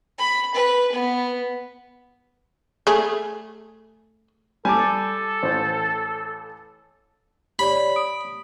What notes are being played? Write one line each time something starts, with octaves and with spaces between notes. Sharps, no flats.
B5
B4
B3
A3 G#4
G3 A4 G#5 A5 D6
A1 C5
G4 C#5 D5 B5
D#6 D7